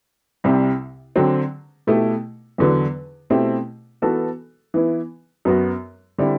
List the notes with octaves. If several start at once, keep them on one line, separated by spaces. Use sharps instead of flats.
C2 C3 G3
D3 F#3 C4
B2 A3 E4 G4
E2 D3 F#3 B3
B2 A3 C4 E4 G4
E3 B3 F#4 A4
E3 B3 E4
F#2 F#3 B3 F#4
D3 G3 C4 E4